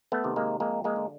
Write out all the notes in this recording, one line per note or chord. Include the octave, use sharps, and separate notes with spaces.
A3 B3
C3 D#3
G#3 A#3
F2 G#3 A#3
G#3 A#3
D3